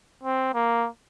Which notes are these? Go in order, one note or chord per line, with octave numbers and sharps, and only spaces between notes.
C4
A#3